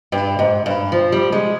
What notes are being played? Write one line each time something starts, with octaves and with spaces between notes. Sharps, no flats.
G2
G#2
G2
F3
G3
G#3